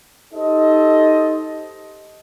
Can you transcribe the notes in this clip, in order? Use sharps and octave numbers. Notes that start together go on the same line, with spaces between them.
D#4 G4 A4 C5 D#5